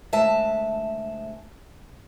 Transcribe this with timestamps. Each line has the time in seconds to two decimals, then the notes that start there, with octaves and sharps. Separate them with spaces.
0.13 D2 G#3 E5 A5